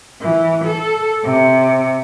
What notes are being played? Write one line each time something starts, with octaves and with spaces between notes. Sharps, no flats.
E3
A4
C3